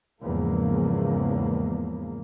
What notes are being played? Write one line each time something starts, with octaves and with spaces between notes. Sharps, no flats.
E2 G#2 C#3 F3 A#3